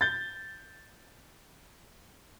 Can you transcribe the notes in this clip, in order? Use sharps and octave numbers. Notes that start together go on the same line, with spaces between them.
G6 A6